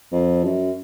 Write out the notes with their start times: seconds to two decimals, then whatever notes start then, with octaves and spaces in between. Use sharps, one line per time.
0.12 F2
0.44 F#2